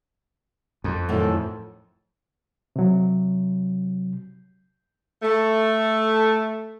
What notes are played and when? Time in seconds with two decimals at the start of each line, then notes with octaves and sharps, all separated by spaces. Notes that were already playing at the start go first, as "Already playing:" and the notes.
0.84 F2
1.09 F#2 A2 D#3 A4
2.76 C3 F#3
5.22 A3